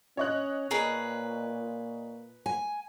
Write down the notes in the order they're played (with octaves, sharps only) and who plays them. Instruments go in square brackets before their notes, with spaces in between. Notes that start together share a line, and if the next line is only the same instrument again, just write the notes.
[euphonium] C#4 [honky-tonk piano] C#5 D#5 F#6
[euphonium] A#2 [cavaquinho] G#4 A#4 B4
[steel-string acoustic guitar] G#5